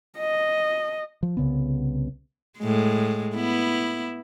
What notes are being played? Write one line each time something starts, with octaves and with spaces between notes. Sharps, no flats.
D#5
F3
C2 C#3 B3
A2 G#3
B3 E4